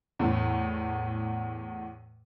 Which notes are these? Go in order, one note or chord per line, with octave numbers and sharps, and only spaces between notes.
E2 A2